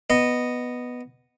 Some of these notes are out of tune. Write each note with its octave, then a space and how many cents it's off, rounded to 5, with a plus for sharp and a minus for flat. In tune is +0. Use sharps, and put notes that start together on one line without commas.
B3 +0 D#5 -10